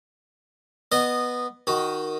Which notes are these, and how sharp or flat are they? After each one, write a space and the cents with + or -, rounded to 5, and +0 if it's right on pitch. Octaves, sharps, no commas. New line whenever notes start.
B3 +0 D#5 -20
D#3 +0 F#4 +10